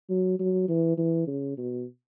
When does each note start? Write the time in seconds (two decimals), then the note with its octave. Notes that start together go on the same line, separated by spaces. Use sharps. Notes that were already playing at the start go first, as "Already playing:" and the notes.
0.10 F#3
0.39 F#3
0.69 E3
0.98 E3
1.27 C#3
1.57 B2